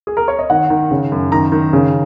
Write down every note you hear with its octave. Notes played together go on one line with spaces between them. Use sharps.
G#4
A#4
C#5
D#5
D#3 F#5
D#3
C#3
F#2
D#3 A#5
D#3
C#3